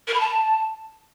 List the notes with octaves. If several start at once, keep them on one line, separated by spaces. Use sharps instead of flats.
A#4
B5
A5